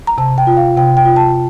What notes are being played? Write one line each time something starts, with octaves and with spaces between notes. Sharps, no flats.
A#5
C3 A5
G5
F4
F5
C3 G5
G5
F4
A5